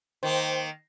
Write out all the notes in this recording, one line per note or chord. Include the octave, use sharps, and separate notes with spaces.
D#3 A#3 C5 G5